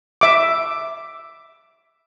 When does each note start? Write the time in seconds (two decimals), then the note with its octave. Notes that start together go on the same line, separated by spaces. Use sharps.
0.21 E5 D6